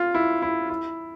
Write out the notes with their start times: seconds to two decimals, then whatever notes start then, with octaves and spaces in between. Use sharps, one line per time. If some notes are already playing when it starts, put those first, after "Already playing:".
Already playing: F4
0.14 E4
0.42 E4
0.70 E4